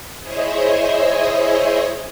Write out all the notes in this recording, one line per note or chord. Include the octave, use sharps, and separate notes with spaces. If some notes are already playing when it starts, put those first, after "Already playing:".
E4 G#4 C5 C#5 D#5 E5